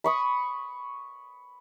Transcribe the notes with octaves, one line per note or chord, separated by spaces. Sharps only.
B5 C#6 D#6